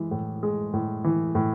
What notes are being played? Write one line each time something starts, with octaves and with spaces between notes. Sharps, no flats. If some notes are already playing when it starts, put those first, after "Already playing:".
Already playing: E3 G#3
A2
G#3
A2
E3
A2